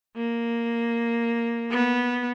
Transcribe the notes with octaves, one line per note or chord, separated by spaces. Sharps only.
A#3
B3